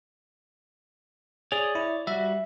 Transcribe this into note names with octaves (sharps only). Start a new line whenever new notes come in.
G#4 C#5 D5 D#6
E4
G3 F#4 E5